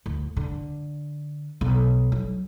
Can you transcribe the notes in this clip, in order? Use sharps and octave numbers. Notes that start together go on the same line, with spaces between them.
D2
D3
B1
F#3